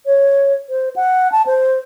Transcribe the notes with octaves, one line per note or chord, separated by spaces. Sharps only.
C#5
C5
F#5
A5
C5